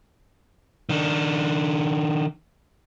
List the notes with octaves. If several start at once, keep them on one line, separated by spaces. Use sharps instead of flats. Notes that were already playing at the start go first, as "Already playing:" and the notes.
D#3 D4